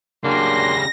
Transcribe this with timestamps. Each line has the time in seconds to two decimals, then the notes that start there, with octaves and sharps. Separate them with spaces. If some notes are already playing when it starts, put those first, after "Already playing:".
0.24 C#3 F#3 G3 A#3 D4 C6 A#6